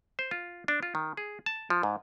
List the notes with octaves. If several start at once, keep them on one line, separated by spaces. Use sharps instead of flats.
C5
F4
D4
F4
D#3
G#4
A5
F3
G#2